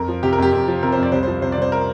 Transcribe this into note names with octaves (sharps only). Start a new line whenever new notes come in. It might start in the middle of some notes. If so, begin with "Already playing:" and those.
Already playing: F2 A#4
F3
C3 G4
A#4
F2 G4
F2
F3
C3 A#4
C5
F2
D5
C2 C5
C5
F3
C3 C5
D5
C2 C5
A#4